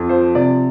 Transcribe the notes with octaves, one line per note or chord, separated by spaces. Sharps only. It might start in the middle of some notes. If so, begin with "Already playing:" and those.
Already playing: F2
F3 C5
C3 D5